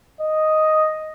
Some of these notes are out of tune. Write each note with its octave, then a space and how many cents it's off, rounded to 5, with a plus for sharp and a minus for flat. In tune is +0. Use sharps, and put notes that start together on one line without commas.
D#5 +0